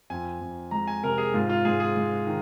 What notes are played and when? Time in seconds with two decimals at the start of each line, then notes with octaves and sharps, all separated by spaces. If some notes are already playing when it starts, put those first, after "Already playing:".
0.10 F2 G#5
0.41 F2
0.71 G#3 A#5
0.87 G#5
1.03 C3 A#4
1.18 G#4
1.34 G#2 F4
1.49 F4
1.65 G#2 G#4
1.80 G#4
1.96 G#3
2.27 D#3